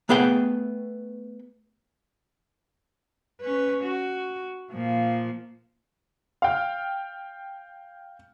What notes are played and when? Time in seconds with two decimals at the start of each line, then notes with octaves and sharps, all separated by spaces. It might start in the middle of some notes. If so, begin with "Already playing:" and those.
0.09 A3 B3 G#4 B4 G5
3.41 C#4 B4
3.84 F#4
4.73 A#2 F3
6.42 F5 G5 F6